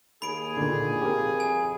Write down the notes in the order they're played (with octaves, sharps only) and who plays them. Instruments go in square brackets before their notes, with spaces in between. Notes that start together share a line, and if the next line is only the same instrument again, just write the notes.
[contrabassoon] D#2 [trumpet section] G#4 [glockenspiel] B5 D7
[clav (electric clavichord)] A#2 D3
[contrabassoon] F2 [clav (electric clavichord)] G4 A#4
[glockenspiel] G#5